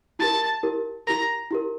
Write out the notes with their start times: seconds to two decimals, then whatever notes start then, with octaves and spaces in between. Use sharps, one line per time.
0.19 E4 G4 A#4 A5
0.63 E4 G4 A#4
1.07 E4 G4 A#4 A#5
1.51 E4 G4 A#4